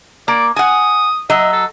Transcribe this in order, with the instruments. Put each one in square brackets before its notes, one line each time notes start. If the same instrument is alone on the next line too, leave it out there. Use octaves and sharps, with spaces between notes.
[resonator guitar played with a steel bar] A#3 [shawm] D5
[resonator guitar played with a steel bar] F#5 G#5 [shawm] D#6
[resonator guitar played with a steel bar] F#3 D#5 [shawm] E5
[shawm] A4